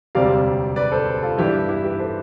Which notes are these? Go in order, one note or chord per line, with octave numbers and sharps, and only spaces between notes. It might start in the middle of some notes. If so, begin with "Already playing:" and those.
E1 D2 C3 G3 C4 D5 F5
B4 D5
A4 C5
F4 A4
G2 E3 B3 D4 E4 G4
E4 G4
G4 B4
A4 C5